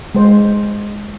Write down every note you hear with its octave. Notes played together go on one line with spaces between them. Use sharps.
G#3 C5